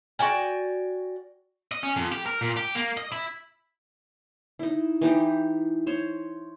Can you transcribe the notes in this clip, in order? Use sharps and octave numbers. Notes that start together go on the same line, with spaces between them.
F#4 D5 G5 G#5
D#5
C#4
F2
G4
A#4
A#2
G4
A#3
D#5
E4
D#4 E4
E3 D#4 G4
C5 C#5